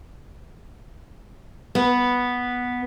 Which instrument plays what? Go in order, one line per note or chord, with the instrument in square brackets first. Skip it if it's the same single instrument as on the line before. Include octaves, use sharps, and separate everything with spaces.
[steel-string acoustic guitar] B3